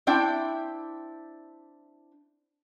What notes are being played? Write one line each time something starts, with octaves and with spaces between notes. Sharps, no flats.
C4 D4 E4 G5